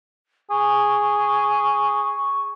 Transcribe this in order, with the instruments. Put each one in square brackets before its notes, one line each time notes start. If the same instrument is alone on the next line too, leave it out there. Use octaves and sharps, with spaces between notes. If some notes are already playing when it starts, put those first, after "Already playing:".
[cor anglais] G#4 [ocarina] C#6